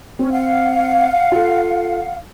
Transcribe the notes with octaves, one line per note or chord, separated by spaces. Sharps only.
C4 C#4
F5 F#5
F4 A4